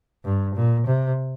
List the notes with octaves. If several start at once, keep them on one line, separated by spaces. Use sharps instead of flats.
G2
A#2
C3